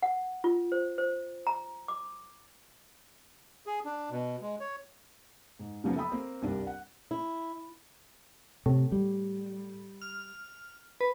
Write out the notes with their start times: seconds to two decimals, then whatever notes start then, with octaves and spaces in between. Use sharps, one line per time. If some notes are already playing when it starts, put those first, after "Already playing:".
0.02 F#5
0.44 F4
0.72 C5
0.98 C5
1.47 A#5
1.88 D6
3.66 G#4
3.85 D4
4.10 B2
4.41 G#3
4.60 C#5
5.59 G#2
5.84 C#3 F3 F#3 A#3 B3
5.96 A4 E5 G5 B5 D#6
6.11 A#3 C4
6.42 C2 G2 D4 A#4
6.67 F#5
7.11 E4
8.66 A2 C3
8.92 G3
10.02 F6
11.01 B4